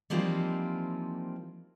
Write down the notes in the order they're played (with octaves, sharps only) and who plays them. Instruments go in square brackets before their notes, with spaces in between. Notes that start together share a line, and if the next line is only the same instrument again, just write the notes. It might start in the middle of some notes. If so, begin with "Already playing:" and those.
[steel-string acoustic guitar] E3 F3 G3 A#3 C4 D#4